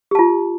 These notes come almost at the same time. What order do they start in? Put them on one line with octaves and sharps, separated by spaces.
G4 A5 F4